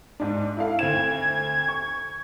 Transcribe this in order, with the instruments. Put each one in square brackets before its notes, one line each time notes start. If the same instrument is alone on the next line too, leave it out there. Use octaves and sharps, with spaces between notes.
[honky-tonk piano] G#2 D4
E4 A4 F5
[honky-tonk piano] D2 C4 E7 [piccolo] G#6
[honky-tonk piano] C#6